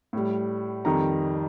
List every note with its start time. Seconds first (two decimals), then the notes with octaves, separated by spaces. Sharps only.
0.13 A2 G3
0.85 F2 D#3 G3 A#5